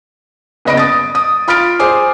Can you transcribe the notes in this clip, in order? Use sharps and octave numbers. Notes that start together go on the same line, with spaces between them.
F#1 B3 D#5 B5 D7
D#6 A6
D#6
F4 B5 F6 A6 D7
G#4 C5 G#5 D6